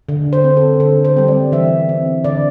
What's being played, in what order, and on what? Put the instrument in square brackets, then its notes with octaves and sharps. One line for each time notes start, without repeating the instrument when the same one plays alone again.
[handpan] D3
C5
C4
A4
D3 A4
C5
G3 C4
D5
E3 E5
C4
D3 D5